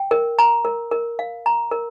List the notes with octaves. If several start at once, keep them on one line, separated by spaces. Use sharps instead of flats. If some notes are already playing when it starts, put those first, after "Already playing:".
Already playing: G5
A#4
A#5
A#4
A#4
F5
A#5
A#4